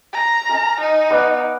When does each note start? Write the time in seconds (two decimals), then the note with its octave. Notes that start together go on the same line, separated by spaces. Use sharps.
0.13 A#5
0.49 A#4 G#5 A5
0.80 D#4
1.10 B3 D5 F5